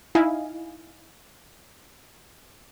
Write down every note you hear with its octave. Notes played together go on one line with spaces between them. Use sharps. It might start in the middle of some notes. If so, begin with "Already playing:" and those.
D#4 E4 D#5 F5 G#5